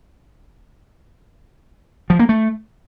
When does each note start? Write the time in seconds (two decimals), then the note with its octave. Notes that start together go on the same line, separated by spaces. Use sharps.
2.10 F3
2.19 A#3
2.29 A3